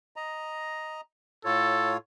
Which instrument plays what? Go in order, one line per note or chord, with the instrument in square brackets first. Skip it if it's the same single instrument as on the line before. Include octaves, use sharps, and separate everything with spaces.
[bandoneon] D#5 A#5
[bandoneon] A2 F4 C#5 [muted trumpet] A4